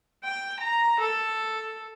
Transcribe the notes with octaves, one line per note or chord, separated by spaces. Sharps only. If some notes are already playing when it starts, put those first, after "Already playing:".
G5
A#5
A4